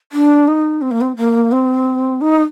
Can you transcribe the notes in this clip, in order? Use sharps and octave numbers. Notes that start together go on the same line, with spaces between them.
D4
D#4
C4
A#3
C4
A#3
C4
D#4